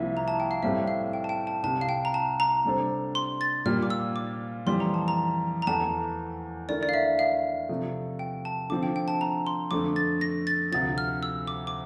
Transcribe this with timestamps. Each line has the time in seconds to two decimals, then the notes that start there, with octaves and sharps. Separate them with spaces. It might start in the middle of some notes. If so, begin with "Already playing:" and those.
Already playing: C2 C3 F3 A#3 E4 E5
0.17 A#5
0.28 A5
0.40 G5
0.51 F5
0.63 A2 G3 C4 E5
0.87 F5
1.13 G5
1.24 A5
1.29 G5
1.47 A5
1.63 C2 C3 G3 A5
1.81 F5
1.89 G5
2.05 A#5
2.14 A5
2.40 A#5
2.65 C3 G3 D4 A4 C5
3.15 C6
3.41 A6
3.66 A#2 G3 A#3 F4 F6
3.83 D6
3.90 E6
4.16 D6
4.66 F2 E3 G3 C6
4.80 A#5
4.94 A5
5.08 A#5
5.62 A#5
5.67 E2 E3 A3 A5
6.69 D3 A3 E4 A#4 D5
6.83 D5
6.89 F5
6.94 E5
7.19 F5
7.69 C3 F3 A3
8.19 G5
8.45 A5
8.70 D3 F3 C4 D6
8.83 G5
8.96 G5
9.08 A5
9.21 A#5
9.47 C6
9.71 F2 D3 A3 D6
9.96 A6
10.21 A#6
10.47 A6
10.72 D2 C3 F3 A6
10.98 F6
11.23 E6
11.47 D6
11.67 D6